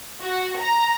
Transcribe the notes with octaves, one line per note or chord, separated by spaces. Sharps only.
F#4
A#5